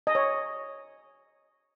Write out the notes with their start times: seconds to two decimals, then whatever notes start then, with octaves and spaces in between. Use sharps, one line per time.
0.07 D#5
0.15 C#5